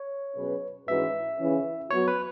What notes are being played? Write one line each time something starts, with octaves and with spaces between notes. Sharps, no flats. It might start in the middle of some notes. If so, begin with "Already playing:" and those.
Already playing: C#5
B2 F#3 C#4 G#4 B4
G#2 E3 C#4 F#4 B4 E5
C#3 E3 C#4
F#3 B3 F#4 C#5
B4